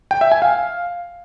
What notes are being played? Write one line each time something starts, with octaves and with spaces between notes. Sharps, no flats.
G5
E5
G#5
F5